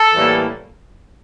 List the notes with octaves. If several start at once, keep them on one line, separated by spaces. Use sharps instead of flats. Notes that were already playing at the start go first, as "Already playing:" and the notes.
Already playing: A4
A2 E3 G3 A#3